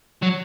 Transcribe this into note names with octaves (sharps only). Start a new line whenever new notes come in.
F#3